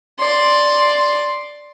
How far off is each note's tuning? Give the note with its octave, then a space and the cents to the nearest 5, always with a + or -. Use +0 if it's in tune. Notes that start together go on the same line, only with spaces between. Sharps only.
D5 +0 C6 +0